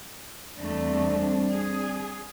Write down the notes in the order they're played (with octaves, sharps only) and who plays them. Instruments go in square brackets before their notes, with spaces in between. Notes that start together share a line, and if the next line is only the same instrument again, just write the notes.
[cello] E2 A3 [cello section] G3 C4 D4
[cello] G#4